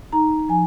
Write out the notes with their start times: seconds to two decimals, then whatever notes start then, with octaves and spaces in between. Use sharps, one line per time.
0.13 D#4 A#5
0.49 F3 G#5